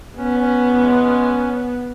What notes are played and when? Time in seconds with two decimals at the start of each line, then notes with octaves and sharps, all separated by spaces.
0.17 B3 C#4
0.39 C#4
0.61 E2
0.81 G#3
1.02 C#4